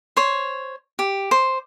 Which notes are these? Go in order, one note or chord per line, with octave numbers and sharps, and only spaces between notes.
C5 C#5
G4
C5